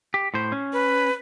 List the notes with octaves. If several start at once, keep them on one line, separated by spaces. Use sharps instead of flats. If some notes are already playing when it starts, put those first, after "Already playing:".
G4
A2 C5
C#4
B4